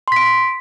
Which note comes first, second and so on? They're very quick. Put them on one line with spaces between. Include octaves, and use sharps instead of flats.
C6 B6 D7